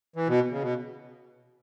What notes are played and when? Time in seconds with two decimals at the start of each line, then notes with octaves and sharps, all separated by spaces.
0.16 E3
0.28 B2
0.51 C#3
0.62 B2